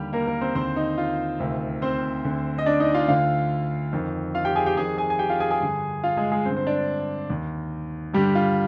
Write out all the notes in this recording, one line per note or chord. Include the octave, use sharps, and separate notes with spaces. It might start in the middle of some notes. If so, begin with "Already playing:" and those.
Already playing: D#2 D3 G3 G4
A#3 A#4
A#3 A#4
C4 C5
D#2 D3 C4 C5
D#4
F4
D2 C3 D#3
C4 C5
D2 D3
D#5
D4 D5
D#4 D#5
F4 F5
D2 D3 F4 F5
F2 D#3
F4 F5
G4 G5
G#4 G#5
G4 G5
F2 D#3 G#4 G#5
G#4 G#5
G#5
G4 G5
F4 F5
G#4 G#5
G#4 G#5
G2 D3
F4 F5
G#3 G#4
G#3 G#4
G2 D3 C4 C5
C5
D4 D5
D#2 D#3
G2 D3 G3 G4
F4